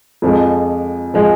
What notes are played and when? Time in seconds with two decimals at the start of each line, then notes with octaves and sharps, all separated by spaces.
0.22 F2 F3 G#3
1.14 F3 G#3